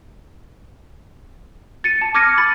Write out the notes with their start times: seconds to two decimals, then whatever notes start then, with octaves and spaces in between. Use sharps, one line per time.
1.84 A6 C#7 D#7
2.01 A5
2.15 D6 F6 G#6 A#6 C#7 D#7
2.38 B5 A6